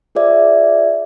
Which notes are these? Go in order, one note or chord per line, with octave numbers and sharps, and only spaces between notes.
F4 G#4 C5 D5 E5